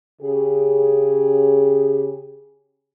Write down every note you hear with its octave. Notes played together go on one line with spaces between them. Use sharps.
C#3 G4 G#4